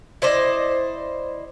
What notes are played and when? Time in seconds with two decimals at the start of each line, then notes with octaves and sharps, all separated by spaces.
0.22 E4 C5 D5 D#5